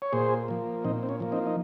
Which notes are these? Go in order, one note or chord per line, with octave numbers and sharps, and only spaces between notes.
C#5
A#2 G#4 C5
F3 A#3
A#2 C4 D#4
C4
C#4
F3 A#3
C4 D#4
D#4